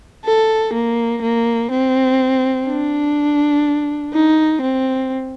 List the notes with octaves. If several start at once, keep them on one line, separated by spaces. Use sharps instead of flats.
A4
A#3
A#3
C4
D4
D#4
C4